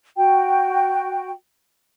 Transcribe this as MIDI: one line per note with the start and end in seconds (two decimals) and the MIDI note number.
0.17 1.31 66
0.17 1.31 79